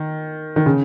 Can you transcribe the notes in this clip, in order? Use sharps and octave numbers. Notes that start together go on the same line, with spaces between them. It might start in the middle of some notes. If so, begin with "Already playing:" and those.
Already playing: D#3
D#3
C#3